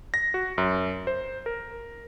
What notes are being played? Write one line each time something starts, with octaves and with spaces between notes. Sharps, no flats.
A#6
F#4
F#2
C5
A#4